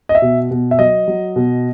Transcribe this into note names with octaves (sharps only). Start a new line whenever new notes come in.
D#5
E5
B2
B2
E5
F#3 D#5
F#3
B2